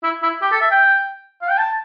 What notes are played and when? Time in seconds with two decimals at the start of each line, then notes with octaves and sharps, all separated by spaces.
0.03 E4
0.22 E4
0.42 G4
0.51 A4
0.61 E5
0.71 G5
1.42 F5
1.49 G5
1.57 A5